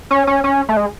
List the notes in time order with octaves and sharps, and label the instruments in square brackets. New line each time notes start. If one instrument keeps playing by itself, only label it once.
[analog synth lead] C#4
C#4
C#4
A3
G#3